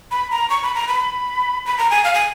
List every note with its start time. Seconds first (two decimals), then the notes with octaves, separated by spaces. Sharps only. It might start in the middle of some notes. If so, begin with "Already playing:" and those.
0.11 B5
0.31 A#5
0.50 C#6
0.63 B5
0.75 A#5
0.88 B5
1.66 B5
1.78 A#5
1.91 G#5
2.04 F5
2.14 G#5